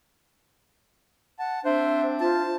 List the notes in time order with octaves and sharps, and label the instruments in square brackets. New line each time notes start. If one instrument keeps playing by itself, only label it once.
[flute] F#5 [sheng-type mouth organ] A5
[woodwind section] C4 D4 [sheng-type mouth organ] C5 [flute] E5
[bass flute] F4 [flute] C5 [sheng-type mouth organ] A5